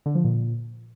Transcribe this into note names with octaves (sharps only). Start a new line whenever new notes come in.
D3
F3
A#2